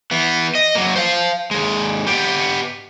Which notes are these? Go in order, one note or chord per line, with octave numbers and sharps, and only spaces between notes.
E3 B3
D#5
F#3 A#3
C5 F5
D#2 G#3
B3 G4